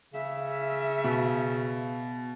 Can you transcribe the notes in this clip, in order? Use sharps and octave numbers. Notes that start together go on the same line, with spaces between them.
C#3 E5
B2